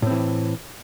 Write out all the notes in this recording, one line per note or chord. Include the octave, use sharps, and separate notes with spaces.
A2 E3 C4